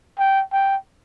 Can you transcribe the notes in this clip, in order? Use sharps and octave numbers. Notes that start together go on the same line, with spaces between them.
G5
G5